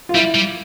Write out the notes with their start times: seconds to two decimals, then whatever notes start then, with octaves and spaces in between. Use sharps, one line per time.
0.09 F4
0.15 G3 E4
0.35 G3